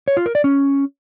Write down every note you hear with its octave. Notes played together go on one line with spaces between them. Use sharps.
C#5
F4
A#4
D5
C#4